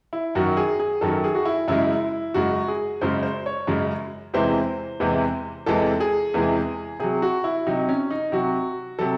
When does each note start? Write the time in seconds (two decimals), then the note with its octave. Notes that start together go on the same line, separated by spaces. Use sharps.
0.13 E4
0.35 F#2 D#3 F#3 F#4
0.57 G#4
0.80 G#4
1.01 F#2 D#3 F#3 A4
1.24 G#4
1.35 F#4
1.46 E4
1.68 F#2 C#3 G#3 E4
2.34 F#2 C#3 G#3 F#4
2.68 G#4
3.01 F#2 C#3 G#3 C5
3.23 C5
3.46 C#5
3.67 F#2 C#3 G#3
4.34 E2 C3 E3 G#3 C5
5.00 E2 C3 E3 G#3
5.66 E2 C3 E3 G#3 A4
6.00 G#4
6.34 E2 C3 E3 G#3
6.99 C3 F#3 G#4
7.22 F#4
7.44 E4
7.66 C3 F#3 D#4
7.89 C#4
8.11 D#4
8.32 C3 F#3 F#4
8.99 C3 F#3 A4